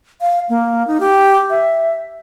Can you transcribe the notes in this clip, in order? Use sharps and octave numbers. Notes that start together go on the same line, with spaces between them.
F5
A#3
D#4
G4
E5